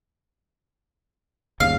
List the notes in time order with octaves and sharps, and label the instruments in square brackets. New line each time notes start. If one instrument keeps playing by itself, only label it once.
[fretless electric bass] G1 D#2 C#3 [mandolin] F5